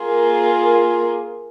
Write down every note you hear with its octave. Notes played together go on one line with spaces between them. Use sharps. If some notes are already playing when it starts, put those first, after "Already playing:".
Already playing: A#3 F4 G#4